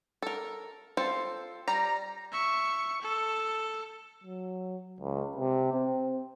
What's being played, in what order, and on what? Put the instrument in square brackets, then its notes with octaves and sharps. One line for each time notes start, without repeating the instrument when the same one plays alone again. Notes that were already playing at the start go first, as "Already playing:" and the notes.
[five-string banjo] A4 A#4
C4 F4 A4
[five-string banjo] G3 [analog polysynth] A#5
[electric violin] E5 C#6
A4
[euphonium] F#3
C#2
C3
C4